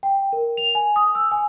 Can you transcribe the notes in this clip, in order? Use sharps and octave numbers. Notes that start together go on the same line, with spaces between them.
G5
A#4
F7
G#5
D#6
E6
G#5